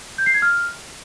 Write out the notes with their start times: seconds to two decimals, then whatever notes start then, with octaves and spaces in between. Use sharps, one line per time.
0.18 G6
0.26 C7
0.34 G#6
0.42 F6